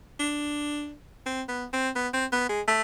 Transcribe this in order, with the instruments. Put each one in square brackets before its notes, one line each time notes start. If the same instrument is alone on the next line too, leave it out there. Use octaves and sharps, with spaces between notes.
[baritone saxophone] D4
C4
B3
C4
B3
C4
B3
G#3
A3